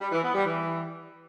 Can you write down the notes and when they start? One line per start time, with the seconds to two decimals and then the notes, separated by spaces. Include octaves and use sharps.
0.01 G3
0.12 E3
0.23 B3
0.34 G3
0.46 E3